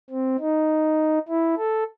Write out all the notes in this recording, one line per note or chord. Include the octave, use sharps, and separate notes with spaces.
C4
D#4
E4
A4